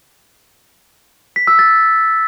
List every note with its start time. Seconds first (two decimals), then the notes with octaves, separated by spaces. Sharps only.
1.36 B6
1.47 E6
1.59 A6